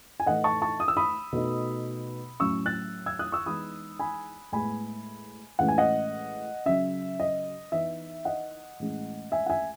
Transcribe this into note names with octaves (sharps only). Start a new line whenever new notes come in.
G#5
A2 E3 A3 D#4 D#5 F#5
A5 C#6
A5 C#6
D#6
E6
B5 D#6
B2 A3 D#4
A2 F#3 C#4 C#6 E6
F#6 A6
E6 G#6
D#6 F#6
C#6 E6
E3 G#3 B3 D#4 B5 D#6
G#5 B5
A2 G#3 B3 G#5 B5
A2 E3 G#3 C#4 F#5
G#5
D#5 F#5
C#3 F#3 C#4 E5
D#5
E3 B3 D#4 E5
D#5 F#5
A2 E3 G#3 C#4
E5 G#5
F#5
E5 G#5